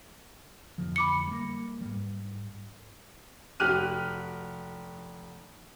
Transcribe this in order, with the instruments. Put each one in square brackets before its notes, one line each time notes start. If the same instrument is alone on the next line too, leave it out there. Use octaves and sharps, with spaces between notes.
[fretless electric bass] F2 D3 F3
[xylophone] B5 D6 C#7
[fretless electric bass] G3 A#3
G#2 G3
[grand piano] F1 F#4 G4 F6 F#6 D#7